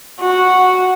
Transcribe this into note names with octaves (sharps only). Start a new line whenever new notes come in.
F#4